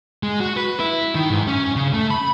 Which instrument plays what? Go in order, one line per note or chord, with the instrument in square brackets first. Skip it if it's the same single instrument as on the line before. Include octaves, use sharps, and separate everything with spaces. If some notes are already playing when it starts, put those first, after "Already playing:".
[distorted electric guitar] G#3
F#4
B4
E4
D#3
G#2
C#4
C#3
A3
B5